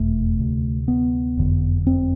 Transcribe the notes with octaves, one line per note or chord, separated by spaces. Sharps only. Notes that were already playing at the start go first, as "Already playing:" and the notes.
Already playing: F1 E2 B2 A3
D2 C3
B3
F#1 F2 D3
C4